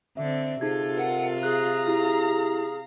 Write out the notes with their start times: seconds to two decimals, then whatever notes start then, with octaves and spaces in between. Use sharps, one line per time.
0.17 D3 C4 E5
0.61 C3 D#4 F4 G#4 A4 G#6
0.97 A#4 F#5
1.43 G#4 F5 A#5 F#6
1.88 E4 G4